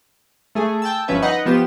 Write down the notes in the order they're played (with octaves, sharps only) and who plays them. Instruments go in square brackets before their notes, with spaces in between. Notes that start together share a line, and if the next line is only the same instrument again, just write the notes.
[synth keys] A3 G#4
G5 A5 E6
G1 F3 C#4 B4 E5
D#4 B4 D#5 F#5
F3 B3 F4 G4 E7